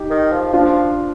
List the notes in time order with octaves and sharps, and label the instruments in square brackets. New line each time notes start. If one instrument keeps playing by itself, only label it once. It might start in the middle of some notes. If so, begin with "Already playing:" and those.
Already playing: [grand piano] D#4 G4
[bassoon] D#3
F3
[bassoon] F3 [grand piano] D4 F4